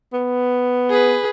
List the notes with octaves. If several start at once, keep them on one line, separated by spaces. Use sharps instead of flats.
B3
G#4 B4